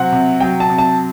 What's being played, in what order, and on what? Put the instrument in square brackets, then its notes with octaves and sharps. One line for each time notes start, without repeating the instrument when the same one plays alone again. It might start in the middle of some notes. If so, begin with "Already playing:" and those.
Already playing: [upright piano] C3 F#3 C4 [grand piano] F#5
[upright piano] C3
[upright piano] F#3 [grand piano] G5
[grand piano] A5
[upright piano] C3
[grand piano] A5